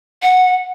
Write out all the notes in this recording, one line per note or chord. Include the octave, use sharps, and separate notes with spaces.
F#5